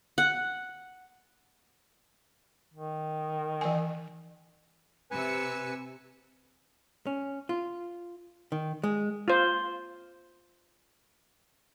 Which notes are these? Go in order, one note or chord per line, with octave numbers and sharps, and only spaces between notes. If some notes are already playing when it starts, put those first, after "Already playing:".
F#5
D#3
E3 G#5
C3 B4 G#5 E6 C#7
C#4
F4
D#3
G#3
F4 C5